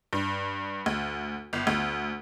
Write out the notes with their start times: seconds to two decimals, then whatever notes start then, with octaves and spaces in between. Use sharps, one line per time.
0.13 G2
0.86 D2
1.53 G1
1.67 D2